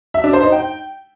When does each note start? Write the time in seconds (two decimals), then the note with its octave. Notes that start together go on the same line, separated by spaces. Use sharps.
0.14 E5
0.24 D4
0.33 C5
0.43 D#4
0.52 G5